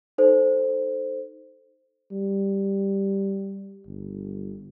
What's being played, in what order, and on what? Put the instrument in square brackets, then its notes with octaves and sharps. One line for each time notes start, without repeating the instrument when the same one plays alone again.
[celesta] D#4 A4 C5
[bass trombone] G3
G1